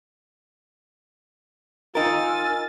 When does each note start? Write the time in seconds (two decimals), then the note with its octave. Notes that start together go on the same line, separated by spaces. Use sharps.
1.95 D#4 F4 A#4 G#5 E6 F6 A6